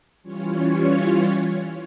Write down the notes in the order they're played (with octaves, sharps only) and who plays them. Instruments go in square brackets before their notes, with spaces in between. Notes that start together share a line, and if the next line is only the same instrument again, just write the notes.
[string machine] E3 G3 C#4 F4 C#5